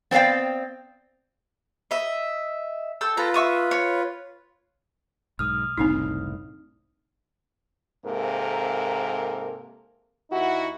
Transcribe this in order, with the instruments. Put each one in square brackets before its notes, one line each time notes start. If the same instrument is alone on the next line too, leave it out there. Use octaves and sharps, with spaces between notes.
[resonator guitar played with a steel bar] B3 C4 D5 F5 G5
[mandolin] D#5 E5
A4 G5 E6
[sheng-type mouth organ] F4 B4 [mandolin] A4 A#5
[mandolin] E5 C#6 D#6
C#5
[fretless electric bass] B1 G#2 [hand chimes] D#6 F6
[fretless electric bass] F#1 C2 A2 [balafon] C4 D4 D#4
[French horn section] G#2 C3 A#3 A4 A#4
D#2 D#4 E4 F#4